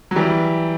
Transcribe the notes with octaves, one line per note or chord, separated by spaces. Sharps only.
F#3
E3 G3